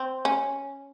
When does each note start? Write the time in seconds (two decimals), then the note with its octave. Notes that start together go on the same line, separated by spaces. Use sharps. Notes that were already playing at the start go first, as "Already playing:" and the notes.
Already playing: C4
0.25 C#4